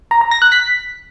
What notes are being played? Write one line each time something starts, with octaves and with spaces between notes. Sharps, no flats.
A#5
A#5
A#6
F#6
B6